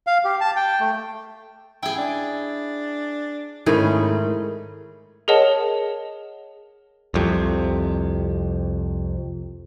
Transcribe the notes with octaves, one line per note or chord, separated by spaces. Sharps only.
F5
G4
A5
G5
A3
E4 G#4 G5
D4
G#2 D#3 A3 C#4 E4 G#4 A#4 B5
G#4 A#4 C#5 D#5 F#5 A5
C2 F2 C3